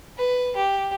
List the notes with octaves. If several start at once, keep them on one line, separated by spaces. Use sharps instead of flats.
B4
G4